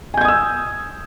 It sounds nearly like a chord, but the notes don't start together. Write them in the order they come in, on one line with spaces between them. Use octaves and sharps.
G#5 G6 G#6 D#6 E6